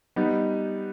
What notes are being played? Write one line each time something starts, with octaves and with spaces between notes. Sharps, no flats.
G3 B3 D#4